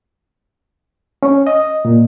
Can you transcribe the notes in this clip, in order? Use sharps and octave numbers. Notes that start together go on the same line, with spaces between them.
C#4
D#5
A#2